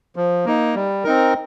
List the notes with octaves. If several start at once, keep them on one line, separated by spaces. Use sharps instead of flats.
F3
A#3 D#4
G3
C4 D#4 A#4